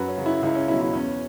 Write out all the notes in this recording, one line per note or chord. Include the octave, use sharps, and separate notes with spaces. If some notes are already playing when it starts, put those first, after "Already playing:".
Already playing: F#2 F#4 B4
C#4
C#3 F#3
E4
C#2 E4
C#4
B2 F#3 E4
E4
E2 C#4